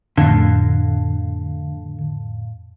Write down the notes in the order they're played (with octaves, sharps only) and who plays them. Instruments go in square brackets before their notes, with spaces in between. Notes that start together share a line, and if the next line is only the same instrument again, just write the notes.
[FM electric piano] F2 A2 [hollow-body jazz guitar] D3